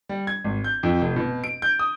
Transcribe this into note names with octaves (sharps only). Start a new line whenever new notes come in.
G3
G#6
G#1
G6
F2
F1
B2
D7
G6
D#6